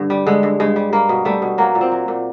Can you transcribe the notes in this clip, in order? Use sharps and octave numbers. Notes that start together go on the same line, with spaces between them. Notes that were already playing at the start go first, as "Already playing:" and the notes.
Already playing: G2 D3
G3
D3 G#3
G2
G2 G#3
G3
G3 A#3
B2
G3 A3
B2
F#3 A#3
A#2
C4
F#3
A#2